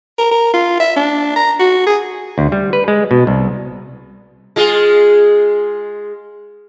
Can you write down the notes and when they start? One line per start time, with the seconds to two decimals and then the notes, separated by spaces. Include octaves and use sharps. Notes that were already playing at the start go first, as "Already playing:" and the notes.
0.18 A#4
0.31 A#4
0.53 F4
0.80 E5
0.97 D4
1.36 A#5
1.60 F#4
1.87 G#4
2.38 D2
2.52 G3
2.73 B4
2.88 G#3
3.11 B2
3.27 C2
4.56 G#3 F4 G#4